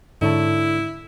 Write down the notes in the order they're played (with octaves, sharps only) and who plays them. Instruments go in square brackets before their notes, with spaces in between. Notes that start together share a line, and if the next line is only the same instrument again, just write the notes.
[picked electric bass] G#2 [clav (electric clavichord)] D3 C#5 A5 [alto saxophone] E4